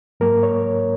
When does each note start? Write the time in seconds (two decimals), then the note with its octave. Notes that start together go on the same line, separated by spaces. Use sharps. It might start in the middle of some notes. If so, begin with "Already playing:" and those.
0.20 G#2 F#3 A#3 A#4
0.43 C#5